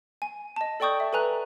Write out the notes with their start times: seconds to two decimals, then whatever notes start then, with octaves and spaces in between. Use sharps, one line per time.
0.22 G#5
0.56 D#5 A5
0.80 A4 D5 G5 C#6 D#6 G6
1.00 E5
1.13 A4 B4 G#5 A#5 F#6